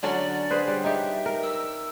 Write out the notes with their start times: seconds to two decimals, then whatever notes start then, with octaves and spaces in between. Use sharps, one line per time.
0.03 D3 F#3 C#4 D5
0.50 G#4 B4 C5
0.68 G3
0.84 D#4 G4 E5
1.26 A#4
1.43 E6